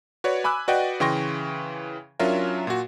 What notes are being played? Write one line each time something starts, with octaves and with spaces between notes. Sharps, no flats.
F#4 B4 C#5 D5
G#5 B5 D6 E6 F#6
F#4 B4 D5 D#5 F#5 G5
C#3 E3 G5 C6 C#6 A#6
F#3 C#4 D4 F4 A#4 E5
A#2 F#4